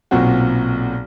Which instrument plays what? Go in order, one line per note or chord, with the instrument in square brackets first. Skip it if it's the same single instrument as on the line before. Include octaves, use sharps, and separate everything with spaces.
[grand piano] B1 A#2 F#3 C4 F#4